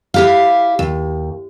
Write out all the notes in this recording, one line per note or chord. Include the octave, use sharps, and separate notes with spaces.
E4 G4 F5
D#2